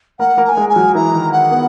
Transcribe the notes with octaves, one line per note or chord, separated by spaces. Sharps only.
A#3 A#4 F#5
A#3 A#4
A#5
G#5
G#3 G#4
G#5
F#3 F#4
E3 E4 A#5
D#3 D#4
F#5
B3